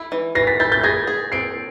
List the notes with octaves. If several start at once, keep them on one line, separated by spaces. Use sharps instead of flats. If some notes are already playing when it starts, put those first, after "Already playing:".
Already playing: E4
E3
E3 A#6 C7
A6 B6
E4 G6 A6
G6 A6
G#4 G#6 A#6
G#4
C4 C7 D7